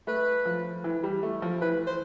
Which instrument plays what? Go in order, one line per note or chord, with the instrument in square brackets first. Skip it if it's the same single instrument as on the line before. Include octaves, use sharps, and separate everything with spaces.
[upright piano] A3 [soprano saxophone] B4
[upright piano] F3
E3
G3
A3
F3
[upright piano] E3 [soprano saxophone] B4
[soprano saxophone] C5